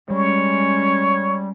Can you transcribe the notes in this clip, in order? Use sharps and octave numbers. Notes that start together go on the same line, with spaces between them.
G3 G#3 C#4 C#5